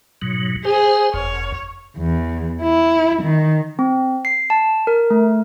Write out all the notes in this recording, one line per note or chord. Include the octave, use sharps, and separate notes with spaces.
G#2 B2 F#3
G#4 C5
F#1 F2 C#5
E2
E4
D#3
C4
C7
A5
A#4
A3